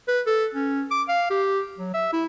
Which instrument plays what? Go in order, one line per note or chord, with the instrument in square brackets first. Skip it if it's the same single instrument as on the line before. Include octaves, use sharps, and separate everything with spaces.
[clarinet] B4
A4
C#4
D6
F5
G4
F#3
E5
E4